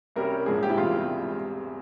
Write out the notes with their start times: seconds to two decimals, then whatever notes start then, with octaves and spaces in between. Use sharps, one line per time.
0.16 C2 C3 G3 C#4 G4 A#4
0.46 A#1 G#2 F3 G#3 G#4
0.63 G4
0.70 E4
0.77 E1 E2 C3 G3 F4